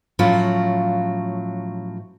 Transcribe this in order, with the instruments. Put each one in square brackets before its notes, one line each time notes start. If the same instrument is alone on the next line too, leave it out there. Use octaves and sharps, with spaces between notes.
[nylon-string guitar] A2 F3 F#3 C#4 F4